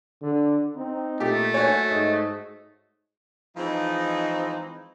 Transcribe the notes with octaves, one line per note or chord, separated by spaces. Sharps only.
D3
C4 D#4
A#2 A3 G4
F#4 C#5 G#5
G#2 D#5
E3 F3 G#3 C4 D#4